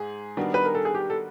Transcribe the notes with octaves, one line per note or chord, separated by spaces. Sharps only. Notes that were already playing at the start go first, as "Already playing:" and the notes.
Already playing: G#2 G#4
D#3 G3 B3 D4 F#4
B4
A#4
A4
G#4
G4
A4